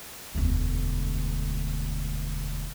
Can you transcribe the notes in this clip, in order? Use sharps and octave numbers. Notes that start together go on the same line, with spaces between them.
E1 D2